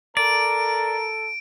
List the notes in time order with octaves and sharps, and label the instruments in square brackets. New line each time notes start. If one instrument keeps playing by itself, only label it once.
[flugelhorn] A4 [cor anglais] A#4 [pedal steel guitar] D5 [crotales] D7